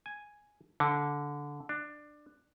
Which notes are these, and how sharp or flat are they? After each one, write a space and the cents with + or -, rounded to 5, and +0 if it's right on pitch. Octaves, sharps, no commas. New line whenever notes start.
G#5 +0
D3 -15
D4 +15